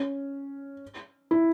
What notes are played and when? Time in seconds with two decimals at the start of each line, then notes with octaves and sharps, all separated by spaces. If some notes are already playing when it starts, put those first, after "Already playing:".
Already playing: C#4
1.31 E4